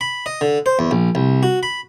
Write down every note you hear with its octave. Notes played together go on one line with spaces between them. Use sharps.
B5
D#5
D3
C5
E2
A#1
C2
F#4
B5